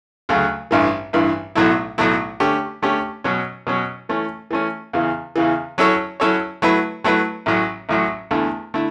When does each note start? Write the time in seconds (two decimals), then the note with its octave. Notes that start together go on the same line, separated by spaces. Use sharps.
0.29 D2 C#3 F#3 A3
0.71 A1 G2 E3
1.13 A1 G2 E3
1.55 B1 A2 F#3 A3 E4
1.98 B1 A2 F#3 A3 E4
2.40 D3 A3 C#4 G4
2.82 D3 A3 C#4 G4
3.24 B2 F#3 C#4
3.67 B2 F#3 C#4
4.09 E3 A3 C#4
4.51 E3 A3 C#4
4.93 E2 C#3 E3
5.36 E2 C#3 E3
5.78 F#3 C#4 E4 A4 C#5
6.20 F#3 C#4 E4 A4 C#5
6.62 F#3 A3 E4 B4
7.04 F#3 A3 E4 B4
7.46 A1 A2 F#3
7.89 A1 A2 F#3
8.31 E2 D3 A3 E4
8.74 D3 A3 E4